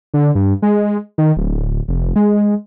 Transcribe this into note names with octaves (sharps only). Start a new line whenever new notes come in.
D3
G2
G#3
D#3
D1
F1
G#3